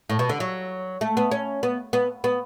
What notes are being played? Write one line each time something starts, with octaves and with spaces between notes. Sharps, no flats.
A2
B2
D3
F#3
A3
B3
C#4
B3
B3
B3